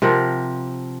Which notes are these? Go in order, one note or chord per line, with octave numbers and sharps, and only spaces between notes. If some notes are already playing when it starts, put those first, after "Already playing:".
C3 F3 A#4 F#5